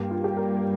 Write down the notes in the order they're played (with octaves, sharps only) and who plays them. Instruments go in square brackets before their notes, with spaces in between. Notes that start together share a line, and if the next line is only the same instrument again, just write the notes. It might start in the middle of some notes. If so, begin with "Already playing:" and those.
Already playing: [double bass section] G2 G3 A#3 [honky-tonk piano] G4
[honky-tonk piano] F4
G4
A#4